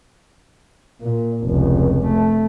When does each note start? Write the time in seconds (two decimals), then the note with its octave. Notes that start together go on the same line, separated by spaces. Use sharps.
1.03 A#2
1.47 F1 C#2
2.07 A3